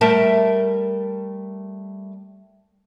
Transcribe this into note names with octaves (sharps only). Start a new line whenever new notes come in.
G3 A3 A#4 E5 A5